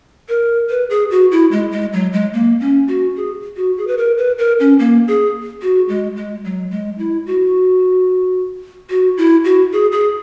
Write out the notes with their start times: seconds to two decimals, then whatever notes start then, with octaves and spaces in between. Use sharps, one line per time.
0.29 A#4
0.70 B4
0.90 G#4
1.11 F#4
1.32 E4
1.52 G#3
1.72 G#3
1.93 F#3
2.13 G#3
2.33 A#3
2.60 C#4
2.88 F#4
3.16 G#4
3.57 F#4
3.77 G#4
3.87 B4
3.98 A#4
4.18 B4
4.38 A#4
4.60 C#4
4.79 A#3
5.08 G#4
5.62 F#4
5.89 G#3
6.16 G#3
6.44 F#3
6.71 G#3
6.98 E4
7.26 F#4
8.90 F#4
9.17 E4
9.44 F#4
9.72 G#4
9.92 G#4